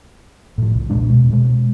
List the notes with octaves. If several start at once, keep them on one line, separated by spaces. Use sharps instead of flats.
A2 F3
C2
E2 A#2 G#3 D4
B2
B2 G#3